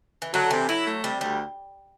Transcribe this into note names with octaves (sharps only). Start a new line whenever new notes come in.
E3
D3 F#3
C3 E3
F#3 E4
A3
C3 G3
D2 G3